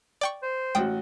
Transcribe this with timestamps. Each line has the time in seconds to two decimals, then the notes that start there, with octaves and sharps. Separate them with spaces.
0.21 D5 G5 C#6
0.43 C5
0.75 A1 F#4 G5 D#6